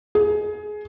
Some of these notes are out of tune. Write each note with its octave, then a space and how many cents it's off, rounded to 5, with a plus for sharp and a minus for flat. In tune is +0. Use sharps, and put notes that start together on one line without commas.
G#4 +20